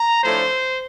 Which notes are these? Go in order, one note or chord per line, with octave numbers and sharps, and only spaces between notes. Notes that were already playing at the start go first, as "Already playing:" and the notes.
Already playing: A#5
A2 F3 A3 D4 C5